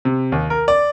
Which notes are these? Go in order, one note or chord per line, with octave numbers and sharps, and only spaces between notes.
C3
D#2
A#4
D5